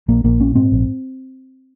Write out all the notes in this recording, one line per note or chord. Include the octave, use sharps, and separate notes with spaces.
A#1 A#3
A#1 A#3
A#2 C#4
G#2 C4
A#1